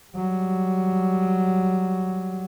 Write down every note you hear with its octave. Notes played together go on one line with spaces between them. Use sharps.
F#3 G3